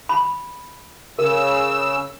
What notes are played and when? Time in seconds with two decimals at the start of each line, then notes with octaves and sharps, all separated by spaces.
0.09 B5
1.19 C#3 A#4 E6